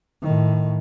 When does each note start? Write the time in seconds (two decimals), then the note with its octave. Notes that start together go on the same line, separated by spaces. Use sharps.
0.22 A2 D#3